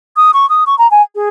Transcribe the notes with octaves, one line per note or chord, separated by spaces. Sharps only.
D#6
C#6
D#6
C#6
A#5
G#5
G#4